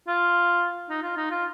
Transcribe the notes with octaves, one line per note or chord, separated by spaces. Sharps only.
F4
D#4
F4
D#4
F4